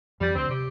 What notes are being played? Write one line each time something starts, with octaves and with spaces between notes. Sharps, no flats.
F2 F3 G3
D2 D3 C4
C3 G4